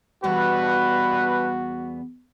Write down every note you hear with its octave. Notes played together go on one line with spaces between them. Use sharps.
E2 G2 G3 B3 F#4 B4